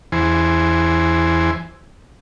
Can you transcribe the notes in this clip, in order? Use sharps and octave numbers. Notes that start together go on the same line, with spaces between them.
E2 E3 C5 G#5